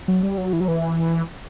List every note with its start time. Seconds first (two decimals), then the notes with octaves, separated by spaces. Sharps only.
0.08 F#3
0.23 G3
0.38 F#3
0.53 E3
0.60 F#3
0.68 E3